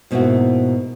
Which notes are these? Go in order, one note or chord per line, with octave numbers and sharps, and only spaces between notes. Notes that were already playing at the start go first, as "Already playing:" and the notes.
G#2 B2 A#3 D4 E4 F#4